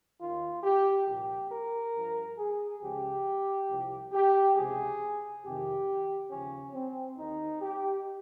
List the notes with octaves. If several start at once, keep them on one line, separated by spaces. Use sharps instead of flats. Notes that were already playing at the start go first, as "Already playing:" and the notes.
D#2 D#3 F4
G4
C2 A#2 F3 G4
A#4
G2 F3
G#4
C#2 C#3 F3 G4
C2 C3 F3
G4
C#2 C3 F3 G#4
F2 C3 D#3 G4
D#2 C#3 F3 C#4
C4
D#2 D#3 D#4
G4